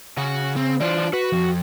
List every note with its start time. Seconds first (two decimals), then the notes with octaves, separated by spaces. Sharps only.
0.17 C#3 F#4
0.56 C4
0.80 E3 D4 F4 C5
1.13 F#4 B4
1.33 F2